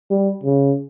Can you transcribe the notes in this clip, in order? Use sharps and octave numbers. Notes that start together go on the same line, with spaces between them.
G3
C#3